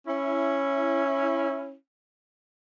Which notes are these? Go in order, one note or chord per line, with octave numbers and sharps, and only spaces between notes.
C#4 E4